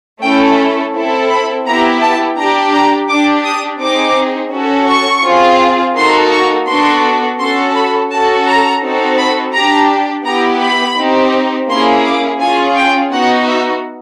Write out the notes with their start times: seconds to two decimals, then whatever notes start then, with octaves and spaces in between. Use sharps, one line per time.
0.22 A3 C#4 E4 A4 G5
0.94 C4 E4 A4
1.30 B5
1.66 B3 E4 G4 A#5
2.01 A5
2.37 D4 G4 A#5
2.73 A#5
3.09 D4 G4 D6
3.45 D#6
3.80 C4 D#4 G#4 D6
4.52 C#4 F#4 A4
4.88 C#6
5.24 C4 F4 G#4
5.95 A#3 D#4 F#4 A4 C6
6.32 C#6
6.67 B3 D4 F#4 A4 C6
7.39 C#4 F#4 A4 C6
7.75 B5
8.11 C#4 F#4 A4 A5
8.47 A#5
8.82 C4 D#4 F#4 A4
9.18 B5
9.54 D4 G4 A#5
10.25 B3 E4 G4 A#5
10.61 B5
10.97 C4 D#4 G4
11.69 A#3 C#4 E4 G#4 C6
12.05 D6
12.40 C#4 F4 G#4 G#5
12.77 G5
13.12 B3 D#4 F#4 F#5
13.48 E5